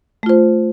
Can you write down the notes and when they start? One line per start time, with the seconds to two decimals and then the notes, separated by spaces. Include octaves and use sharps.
0.23 A3
0.26 F4
0.29 C5